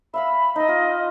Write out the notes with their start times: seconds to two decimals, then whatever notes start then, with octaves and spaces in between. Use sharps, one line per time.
0.14 E5 F5 B5 E6
0.56 D#4 D#5 E6
0.68 F4